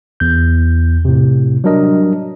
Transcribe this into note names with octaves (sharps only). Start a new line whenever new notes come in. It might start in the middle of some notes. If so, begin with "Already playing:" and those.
E2 G6
A2 C3
F#3 G3 D4 A#4 D#5